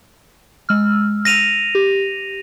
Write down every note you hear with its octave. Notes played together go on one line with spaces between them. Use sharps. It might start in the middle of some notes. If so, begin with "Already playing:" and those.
G#3 E6 F6
A#6 D#7 F7
G4